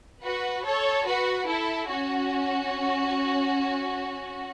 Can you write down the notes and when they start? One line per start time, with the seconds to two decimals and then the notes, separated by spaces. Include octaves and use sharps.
0.23 F#4 B4
0.64 A4 C#5
1.06 F#4 B4
1.47 E4 A4
1.89 C#4 F#4